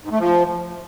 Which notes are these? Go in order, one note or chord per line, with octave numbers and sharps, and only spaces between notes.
G#2
A3
F3